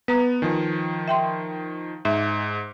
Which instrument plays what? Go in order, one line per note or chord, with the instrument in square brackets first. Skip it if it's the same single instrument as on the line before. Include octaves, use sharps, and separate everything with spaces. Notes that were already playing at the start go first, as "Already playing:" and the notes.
[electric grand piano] B3 [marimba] B4 A#5 D#6
[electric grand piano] D#3 F3 [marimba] G#5
[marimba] E5 G5 C6
[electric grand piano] G#2 [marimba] E5